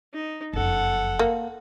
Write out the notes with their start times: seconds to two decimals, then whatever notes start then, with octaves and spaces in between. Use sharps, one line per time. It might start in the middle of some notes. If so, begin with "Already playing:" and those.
0.14 D#4
0.53 F#1 F2 A4 F#5
1.19 A#3